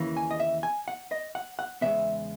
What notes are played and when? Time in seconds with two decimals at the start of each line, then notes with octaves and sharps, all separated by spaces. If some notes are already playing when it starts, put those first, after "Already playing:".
Already playing: D#2 C#3 E3 A#3
0.17 G#5
0.31 D#5
0.40 E5
0.63 G#5
0.88 F#5
1.11 D#5
1.35 F#5
1.59 F#5
1.81 E2 C#3 G#3 B3 E5